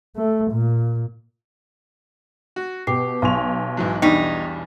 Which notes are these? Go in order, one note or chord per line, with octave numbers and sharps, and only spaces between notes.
A3
A#2
F#4
B2 G4 D6 C7
B1 F5 G#5 C6 C#6 F7
G#2 E3 F#3
E2 G3 D4 D#4 G5 C#6 B6